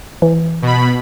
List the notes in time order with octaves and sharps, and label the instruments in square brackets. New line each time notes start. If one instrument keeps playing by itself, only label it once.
[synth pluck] E3
[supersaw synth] B2 B5